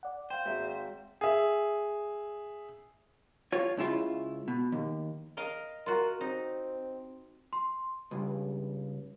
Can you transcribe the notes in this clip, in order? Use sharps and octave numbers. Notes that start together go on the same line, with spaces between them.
D5 F#5
C5 F5 G5
G#1 F#4 E5
G#4 E5
F4 C#5
C#2 C#3 E4 F4 E5
B2
D#2
A#4 D#5 F5
F4 F#4 A#4
C4 D#4
C6
C#2 G2